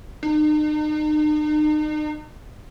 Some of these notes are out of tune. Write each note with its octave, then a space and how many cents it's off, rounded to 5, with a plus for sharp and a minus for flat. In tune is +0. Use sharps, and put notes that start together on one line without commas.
D#4 -40